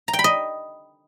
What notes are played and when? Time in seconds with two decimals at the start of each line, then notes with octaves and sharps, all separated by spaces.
0.08 A#5
0.13 G5
0.19 B5
0.24 D#5